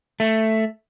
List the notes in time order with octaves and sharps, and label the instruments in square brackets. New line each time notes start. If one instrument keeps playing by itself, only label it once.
[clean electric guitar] A3